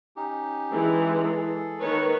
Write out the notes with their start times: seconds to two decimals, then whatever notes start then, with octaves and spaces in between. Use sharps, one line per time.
0.16 C#4 D#4 G4
0.72 E3 G#3
1.23 G#4 A4
1.81 D#3 B4 C#5